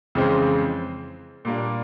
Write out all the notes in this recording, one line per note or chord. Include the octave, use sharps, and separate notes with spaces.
F2 C#3 E3 G#3 C4
A#2 G3 A#3 D4